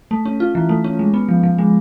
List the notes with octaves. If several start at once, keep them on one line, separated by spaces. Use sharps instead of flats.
A3
C#4
F4
E3
A3
C#4
G#3
B3
F3
F3
G#3